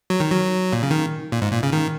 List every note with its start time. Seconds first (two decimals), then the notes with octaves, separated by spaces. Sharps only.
0.10 F#3
0.20 D#3
0.31 F#3
0.73 A#2
0.83 C#3
0.91 D#3
1.32 A#2
1.42 G#2
1.52 A#2
1.63 C#3
1.73 D#3